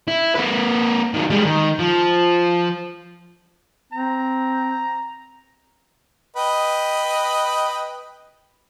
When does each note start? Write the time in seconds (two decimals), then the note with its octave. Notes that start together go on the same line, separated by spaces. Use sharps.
0.08 E4
0.36 A#3 B4
1.14 D#3 F#3
1.30 G3 G#3
1.45 D#3
1.79 F3
3.92 C4 A#5
6.36 B4 D#5 G5